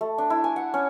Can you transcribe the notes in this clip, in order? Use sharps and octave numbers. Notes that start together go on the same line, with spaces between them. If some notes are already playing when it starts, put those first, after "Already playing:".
A3
D4
E4
G#5
F#5
C#4